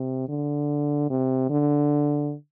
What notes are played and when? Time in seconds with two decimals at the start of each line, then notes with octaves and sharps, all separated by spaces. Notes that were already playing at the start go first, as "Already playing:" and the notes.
Already playing: C3
0.29 D3
1.10 C3
1.50 D3